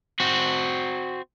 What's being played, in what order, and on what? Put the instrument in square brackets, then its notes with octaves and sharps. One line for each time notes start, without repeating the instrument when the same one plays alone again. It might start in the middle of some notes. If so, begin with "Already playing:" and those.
[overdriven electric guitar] C4 F#4